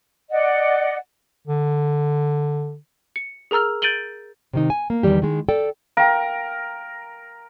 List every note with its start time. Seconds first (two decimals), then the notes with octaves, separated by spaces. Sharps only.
0.30 D5 D#5 F#5
1.47 D3
3.16 C#7
3.51 G#4 A#4 A#5 E6 F6
3.82 G6 A6 D7 D#7 F#7 G7
4.53 C3 D#3 D#4
4.70 G#5
4.90 A#3
5.03 E2 A#2 D#3 G3 G4
5.22 D#3 G#3
5.49 A4 D5 G5
5.97 A#4 F5 G5